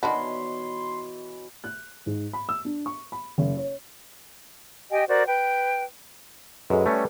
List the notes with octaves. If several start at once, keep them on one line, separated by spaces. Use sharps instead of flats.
B2 D#3 E3 D4 F#4 C#5 B5 C6
F#6
G#2
B5
E6
D4
C#6
B5
F#1
C#5
G4 D#5 G5 G#5
F#4 A#4 C5 D5
B4 G5
F#2 G#3 A4 B4
G3 A3 C#4